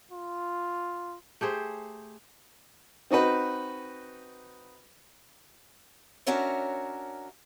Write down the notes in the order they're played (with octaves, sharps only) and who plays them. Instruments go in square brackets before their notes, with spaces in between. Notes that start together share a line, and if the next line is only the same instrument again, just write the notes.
[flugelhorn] F4
[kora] A3 G4 G#4 C5
[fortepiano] C4 D#4 F#4 B4
[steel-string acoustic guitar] C#4 D4 F#4 A#4 C#5 E5